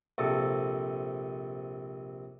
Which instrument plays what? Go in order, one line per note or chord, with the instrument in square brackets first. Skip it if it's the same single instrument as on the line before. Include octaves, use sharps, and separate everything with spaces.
[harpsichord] A#1 C3 A4